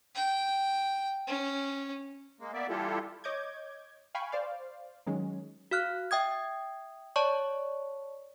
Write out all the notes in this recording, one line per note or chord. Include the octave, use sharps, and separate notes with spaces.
G5
C#4
G#3 A#3
A#3 B3 D5 E5
E3 G3 E4 F4 G4 A4
C#5 D#5 D6 G6 G#6
F5 G5 G#5 B5 C#6
C5 D5 F5
D#3 F#3 G#3 C#4
F#4 F5 F6 F#6
E5 G5 D#6 G#6
C#5 D5 A5 C#6